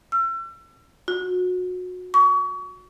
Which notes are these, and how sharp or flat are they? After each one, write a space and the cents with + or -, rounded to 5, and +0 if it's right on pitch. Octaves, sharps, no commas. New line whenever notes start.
E6 +40
F#4 -25
C#6 +35